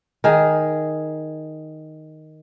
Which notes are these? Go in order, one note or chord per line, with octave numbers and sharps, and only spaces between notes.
D#3 G#4